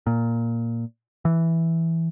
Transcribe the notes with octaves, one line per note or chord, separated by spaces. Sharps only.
A#2
E3